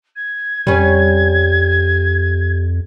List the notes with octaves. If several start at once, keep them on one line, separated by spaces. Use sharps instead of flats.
G#6
F2 G3 C#4